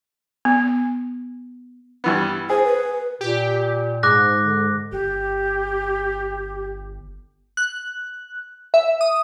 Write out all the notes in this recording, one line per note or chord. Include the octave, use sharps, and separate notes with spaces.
B3
G2 E3 B3
G#4 C5
B4
A#2 G4
G#2 D6 F#6 A#6
D3
G1 G4
F#6
E5
D#6